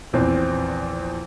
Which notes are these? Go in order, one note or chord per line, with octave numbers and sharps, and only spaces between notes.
A#1 E2 C4